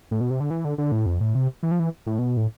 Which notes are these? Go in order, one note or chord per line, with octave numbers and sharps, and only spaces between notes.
A2
B2
C3
D3
E3
D3
D3
A2
F2
A2
C3
E3
F3
E3
A2
B2
A2